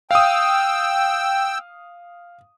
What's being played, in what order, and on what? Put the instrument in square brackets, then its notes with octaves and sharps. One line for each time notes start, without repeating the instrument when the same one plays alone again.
[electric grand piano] F5 D#6 [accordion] G5 E6